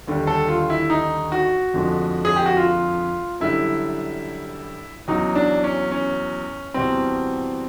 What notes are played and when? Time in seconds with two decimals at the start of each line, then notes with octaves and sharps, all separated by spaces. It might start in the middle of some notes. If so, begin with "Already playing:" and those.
0.07 D#2 D3 G3
0.27 A4
0.48 F4
0.70 E4
0.90 D#4
1.32 F#4
1.74 F2 D3 F3 G#3
2.25 G#4
2.36 G4
2.46 F#4
2.57 F4
3.40 F#2 D3 G3 E4
5.08 E2 C#3 F#3 D#4
5.35 D4
5.64 C#4
5.91 C#4
6.74 E2 B2 G3 C4